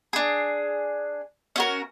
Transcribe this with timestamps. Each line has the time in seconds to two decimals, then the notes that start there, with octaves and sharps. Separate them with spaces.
0.13 D4 G#4
1.56 C#4 F#4 A#4